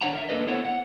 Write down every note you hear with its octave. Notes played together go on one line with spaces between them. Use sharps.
D3 D4 F#4 C#5 F#5 A#5
A#4 D#5 E5
A#3 D4 A4 B4 D#5
B3 E4 A4 C5 C#5 F#5
F#5